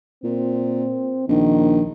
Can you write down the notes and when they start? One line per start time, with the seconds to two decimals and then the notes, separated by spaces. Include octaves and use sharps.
0.24 A#2 C4
1.28 A#1 D#3